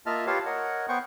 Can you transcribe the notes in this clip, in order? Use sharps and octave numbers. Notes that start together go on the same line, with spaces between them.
A#3 F4 D#5 E5 A5 F6
F4 G4 B4 C#5 F5 A5
A#4 C#5 D#5 F#5
B3 C5 F#5 G5 C#6